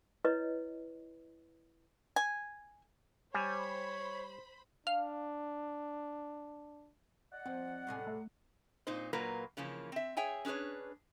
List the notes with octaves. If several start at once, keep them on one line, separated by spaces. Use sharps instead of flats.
E4 B4 C#5 D#5
G#5
G3 C5 C#5 G#5 B5
D4 F5
D5 D#5 F#5
F3 C4
A2 C3 G#4
A3
A#2 C4 D#4 C5
A#2 F#3 A#3 F4 A#4 B4
C#3 E3 F3 A#3 C#4
C4 E5
G#4 C#5 E5 G5 G#5
C#4 D4 G#4 B4 C#5